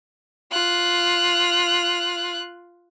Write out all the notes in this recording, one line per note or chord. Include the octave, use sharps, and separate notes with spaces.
F4 F#6